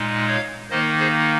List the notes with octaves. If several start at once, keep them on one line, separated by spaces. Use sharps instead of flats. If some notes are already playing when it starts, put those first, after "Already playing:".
Already playing: A#2 G#3 D#4
C#5 F5
D#3 A#3 D#4 C5 D#5
G#4 C5